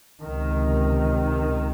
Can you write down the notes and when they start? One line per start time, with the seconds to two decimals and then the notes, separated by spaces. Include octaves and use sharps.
0.23 C#2 C3 D#3